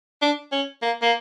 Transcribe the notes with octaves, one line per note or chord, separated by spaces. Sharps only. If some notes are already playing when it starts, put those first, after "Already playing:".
D4
C#4
A#3
A#3